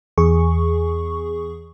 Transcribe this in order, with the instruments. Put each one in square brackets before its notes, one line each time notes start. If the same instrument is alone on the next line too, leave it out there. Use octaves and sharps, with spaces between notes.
[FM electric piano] E2 G#4 C#6